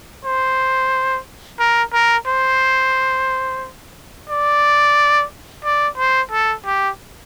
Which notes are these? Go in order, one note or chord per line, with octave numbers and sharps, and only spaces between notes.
C5
A#4
A#4
C5
D5
D5
C5
A4
G4